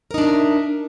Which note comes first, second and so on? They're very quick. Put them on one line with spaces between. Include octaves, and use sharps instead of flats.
A#4 D#4 D4 E5